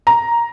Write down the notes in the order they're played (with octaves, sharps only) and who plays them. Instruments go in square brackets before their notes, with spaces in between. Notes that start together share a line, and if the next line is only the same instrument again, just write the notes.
[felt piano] A#5